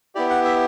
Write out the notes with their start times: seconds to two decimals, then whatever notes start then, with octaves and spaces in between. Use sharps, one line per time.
0.15 B3 E4 G4 D5
0.30 F#5
0.45 E5